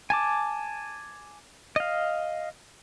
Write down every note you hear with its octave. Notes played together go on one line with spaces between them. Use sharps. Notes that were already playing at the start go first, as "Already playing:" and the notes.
G#5 A5 D6
D#5 F5